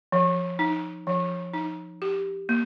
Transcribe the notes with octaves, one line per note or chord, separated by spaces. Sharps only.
F3
D#4
F3
D#4
G4
A#3